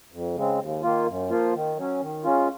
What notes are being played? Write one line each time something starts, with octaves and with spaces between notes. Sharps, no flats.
F2
C#3 G#3 C4
D#2
D#3 A#3 F4
F#2
F3 A#3 F4
D#3
F#3 C#4
D#3
G#3 C#4 F4